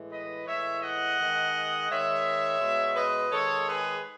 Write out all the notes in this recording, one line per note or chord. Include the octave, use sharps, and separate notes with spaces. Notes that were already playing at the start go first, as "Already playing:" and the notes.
Already playing: A2 E3 G#3
B4 D#5
A2 E3 G#3 C#5 E5
D#5 F#5
D#3 G#3
D#3 G#3 C#5 E5
B2 G#3
B4 D#5
D#3 G#3 A4 C#5
G#4 B4